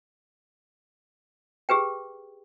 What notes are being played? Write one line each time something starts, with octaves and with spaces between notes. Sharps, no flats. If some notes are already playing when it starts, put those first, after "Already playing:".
G4 G#4 B4 G5